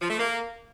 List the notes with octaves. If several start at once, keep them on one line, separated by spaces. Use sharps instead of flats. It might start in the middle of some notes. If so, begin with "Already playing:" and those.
F3
A3
A#3